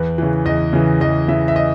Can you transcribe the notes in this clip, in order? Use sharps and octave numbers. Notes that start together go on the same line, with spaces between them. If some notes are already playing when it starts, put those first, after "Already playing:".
Already playing: E2 B4
C#3 E3
E2 D#5
C#3 E3
E2 D#5
C#3 E3 E5
E5
D#5